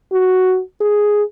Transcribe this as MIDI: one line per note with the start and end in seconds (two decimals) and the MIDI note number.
0.12 0.61 66
0.81 1.23 68